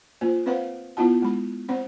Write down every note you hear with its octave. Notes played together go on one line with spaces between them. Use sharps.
A#3 F4 C5
C4 B4 C5 F5 F#5
B3 E4 F4 F#5 A5
G#3 B5
C4 C5 F#5